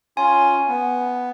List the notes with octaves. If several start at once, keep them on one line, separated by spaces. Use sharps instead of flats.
C#4 F4 G#5 C6
B3